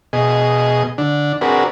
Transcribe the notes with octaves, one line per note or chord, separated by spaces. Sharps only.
B2 G#4 D#5
D3 D4
C4 D4 F#4 G#4 A#4 B4